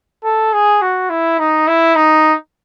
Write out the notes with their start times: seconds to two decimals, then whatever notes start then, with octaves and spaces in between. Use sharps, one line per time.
0.24 A4
0.53 G#4
0.82 F#4
1.10 E4
1.39 D#4
1.68 E4
1.96 D#4